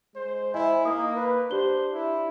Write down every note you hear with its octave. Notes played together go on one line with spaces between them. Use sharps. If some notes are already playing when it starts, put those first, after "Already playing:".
G#3 C5
E4 C5 D#5 G#5
A#3 D#4 D#6
B4
D4 G4 C5 G7
E4